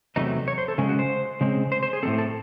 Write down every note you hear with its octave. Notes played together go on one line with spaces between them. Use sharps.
E2 C3 F#3 A3 D#4
C#5
C5
A4
C#3 G#3 C#4 G#4
F#4
C5
C#3 G#3 C4
C5
C5
G#4
A2 G#3 C4 A4
A4